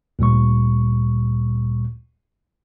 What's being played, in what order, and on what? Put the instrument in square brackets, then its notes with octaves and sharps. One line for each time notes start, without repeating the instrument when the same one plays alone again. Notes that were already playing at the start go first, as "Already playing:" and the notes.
[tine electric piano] D2 A#2 G3 C#6